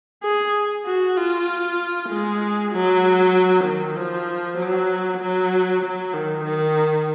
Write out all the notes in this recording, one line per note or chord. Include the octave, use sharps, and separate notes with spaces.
G#4
F#4
F4
G#3
F#3
D#3
F3
F#3
F#3
F#3
D#3
D#3